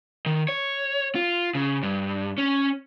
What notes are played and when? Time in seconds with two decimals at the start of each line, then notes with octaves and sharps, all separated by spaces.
0.26 D#3
0.49 C#5
1.15 F4
1.55 C#3
1.83 G2
2.38 C#4